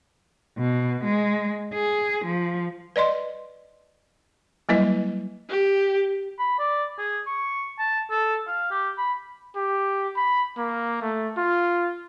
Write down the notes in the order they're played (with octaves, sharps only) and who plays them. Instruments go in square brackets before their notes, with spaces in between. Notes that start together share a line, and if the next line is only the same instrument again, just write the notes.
[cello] B2
G#3
G#4
F3
[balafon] B4 D5 D#5 C6
F#3 G3 A#3 E4 B4 D#5
[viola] G4
[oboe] B5
D5
G#4
C#6
A5
A4
F5
G4
B5
[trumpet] G4
B5
A#3
A3
F4